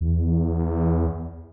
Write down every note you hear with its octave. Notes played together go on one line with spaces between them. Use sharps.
E2